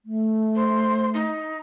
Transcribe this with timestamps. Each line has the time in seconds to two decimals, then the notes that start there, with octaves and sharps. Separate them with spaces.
0.05 A3
0.55 C5
1.14 D#4